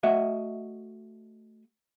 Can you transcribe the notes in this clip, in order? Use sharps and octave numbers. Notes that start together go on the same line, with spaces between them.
A3 F#4 D#5 E5